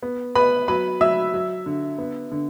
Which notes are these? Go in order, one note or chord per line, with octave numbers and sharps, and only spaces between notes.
B3
B3 B4 B5
F#3 B4 B5
F#3 E5 E6
F#3
D3
B3
D3